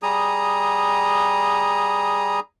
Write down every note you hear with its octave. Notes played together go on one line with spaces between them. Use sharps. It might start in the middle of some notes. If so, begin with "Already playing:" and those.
G3 G#4 A#5 D#6